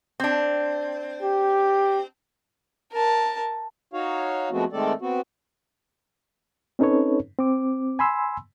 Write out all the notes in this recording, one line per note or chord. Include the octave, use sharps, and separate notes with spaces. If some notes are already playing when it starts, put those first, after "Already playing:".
C4 D4
G4
A#4 A5
D#4 F#4 C#5 F5
F3 G#3 A3 B3 C4 F#4
D#3 G#3 A3 C4 A4 D5
B3 C4 F#4
C4 C#4 D#4 A4 B4 C#5
C4 D6
G#5 B5 C6 E6